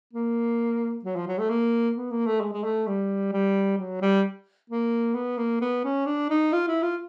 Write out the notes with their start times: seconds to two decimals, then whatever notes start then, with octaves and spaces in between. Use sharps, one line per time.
0.13 A#3
1.05 F#3
1.16 F3
1.28 F#3
1.39 A3
1.50 A#3
1.96 B3
2.11 A#3
2.26 A3
2.41 G#3
2.53 G#3
2.64 A3
2.87 G3
3.33 G3
3.78 F#3
4.01 G3
4.70 A#3
5.15 B3
5.38 A#3
5.61 B3
5.84 C#4
6.06 D4
6.30 D#4
6.53 F4
6.68 E4
6.83 F4